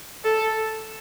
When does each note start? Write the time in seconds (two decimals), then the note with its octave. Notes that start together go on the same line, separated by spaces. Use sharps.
0.24 A4